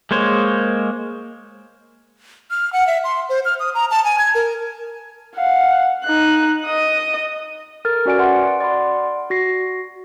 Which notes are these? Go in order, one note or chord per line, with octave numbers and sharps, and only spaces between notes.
G#3 A#3 C5 C#5
F6
F#5
E5
C6
C5
F6
D#6
A#5
A5
G#5
G#6
A#4
F5 F#5
D#4 F#6
D#5 D#6
A4 A#4 F6 A6
C#4 F#4 D5 G#5 D7
B4 D5 E5 F#5 C6
D5 F#5 B5 C6
F#4 A#6 C7